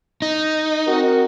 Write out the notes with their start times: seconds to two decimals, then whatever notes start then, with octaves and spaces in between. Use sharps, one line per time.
0.22 D#4
0.87 C4 F#4 A#4